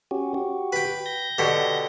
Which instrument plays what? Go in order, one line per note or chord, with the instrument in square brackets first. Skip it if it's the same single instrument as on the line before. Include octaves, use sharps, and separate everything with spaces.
[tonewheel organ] C#4 F#4 G4
F#4 G4
[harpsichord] B4 G5
[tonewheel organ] G6 A#6
[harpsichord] B2 D3 G4